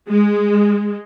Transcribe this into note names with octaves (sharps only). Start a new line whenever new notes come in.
G#3